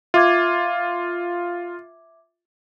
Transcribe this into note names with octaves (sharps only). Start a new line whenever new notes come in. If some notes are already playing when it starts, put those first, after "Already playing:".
F4 E5 D6 G#6